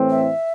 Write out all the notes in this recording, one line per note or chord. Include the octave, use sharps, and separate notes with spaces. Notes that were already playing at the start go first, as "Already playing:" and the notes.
Already playing: A2 E3 A3 C4
E5